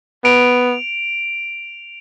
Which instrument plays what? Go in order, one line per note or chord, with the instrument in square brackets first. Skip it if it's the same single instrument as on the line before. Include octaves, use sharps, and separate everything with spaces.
[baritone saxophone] B3 [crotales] D7 F7